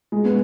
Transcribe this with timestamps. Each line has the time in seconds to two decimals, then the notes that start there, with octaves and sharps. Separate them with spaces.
0.12 G#3
0.25 B3